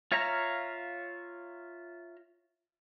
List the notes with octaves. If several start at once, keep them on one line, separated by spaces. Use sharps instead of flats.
F4 C#5 E5 F5 A#5